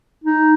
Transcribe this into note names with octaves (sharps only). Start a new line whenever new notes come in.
D#4